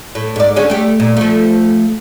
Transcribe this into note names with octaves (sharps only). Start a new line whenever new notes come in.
A2
G#2 D5
D3 C#4 G#4
A3 G4
A#2
F3 A3